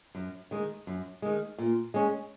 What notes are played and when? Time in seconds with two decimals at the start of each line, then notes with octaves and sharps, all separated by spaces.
0.15 F#2
0.51 D#3 G#3
0.87 F#2
1.22 D#3 G#3
1.58 A#2
1.94 G#3 C#4